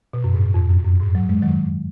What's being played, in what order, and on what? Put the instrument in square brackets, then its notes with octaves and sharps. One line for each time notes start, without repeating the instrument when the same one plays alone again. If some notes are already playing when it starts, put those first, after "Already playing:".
[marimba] B2
F#2
G#2
F2
F#2
F#2
G#2
F#3
G#3
D#3 F#3